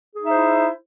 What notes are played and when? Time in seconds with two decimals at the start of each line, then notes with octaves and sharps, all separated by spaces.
0.16 G#4
0.20 D#4
0.25 E5
0.30 C5
0.35 E4